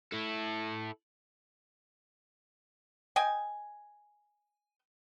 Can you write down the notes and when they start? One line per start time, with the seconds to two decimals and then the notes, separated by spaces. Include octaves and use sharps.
0.12 E4 A4
3.16 D#5 G5 G#5